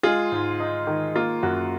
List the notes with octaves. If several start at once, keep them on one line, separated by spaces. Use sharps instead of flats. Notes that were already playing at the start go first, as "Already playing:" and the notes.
G#3 F4 G#4
G#2
D#4
D#3
A#3 F4
F#2 F#4